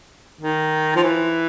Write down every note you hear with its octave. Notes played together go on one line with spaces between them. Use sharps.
D#3
F3
E3